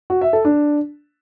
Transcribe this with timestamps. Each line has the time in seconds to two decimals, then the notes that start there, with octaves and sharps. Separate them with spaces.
0.10 F#4
0.21 E5
0.33 A4
0.45 D4